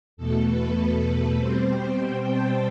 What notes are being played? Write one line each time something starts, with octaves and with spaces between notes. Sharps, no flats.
E2 B2 A3 A4
B4
B2 G3 C4 C5
G5
A5